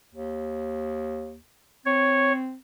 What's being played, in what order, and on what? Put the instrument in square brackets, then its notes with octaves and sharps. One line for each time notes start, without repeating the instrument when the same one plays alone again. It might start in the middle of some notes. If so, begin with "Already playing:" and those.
[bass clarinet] D#2
[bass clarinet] C4 [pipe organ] C#5